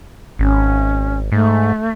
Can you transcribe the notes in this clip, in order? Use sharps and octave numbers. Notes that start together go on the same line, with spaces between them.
G#1 C#4
G#2 A3